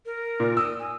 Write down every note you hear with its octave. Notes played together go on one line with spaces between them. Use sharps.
A#4
A#2
D#6 E6
G#5